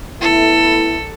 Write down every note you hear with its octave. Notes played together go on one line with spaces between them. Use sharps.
A3 B3 E4 A4